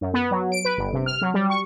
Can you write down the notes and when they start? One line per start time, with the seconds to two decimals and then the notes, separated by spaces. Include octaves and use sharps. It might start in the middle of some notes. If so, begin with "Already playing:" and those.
0.01 F#2
0.14 B3
0.31 F#3
0.52 D7
0.65 B4
0.78 G1
0.93 C3
1.06 F6
1.22 F#3
1.34 G3
1.50 C#6